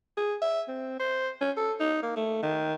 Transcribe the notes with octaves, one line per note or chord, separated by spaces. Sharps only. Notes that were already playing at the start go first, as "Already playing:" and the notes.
G#4
E5
C4
C5
C#4
A4
D#4
A#3
A3
D#3